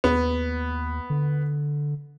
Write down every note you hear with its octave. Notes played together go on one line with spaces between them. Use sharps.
D#2 B3
D3